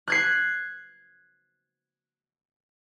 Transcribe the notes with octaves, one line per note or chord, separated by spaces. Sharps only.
F#6 G#6 C7